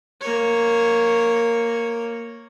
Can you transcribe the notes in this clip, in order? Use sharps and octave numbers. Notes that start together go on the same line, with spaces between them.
A#3 C#5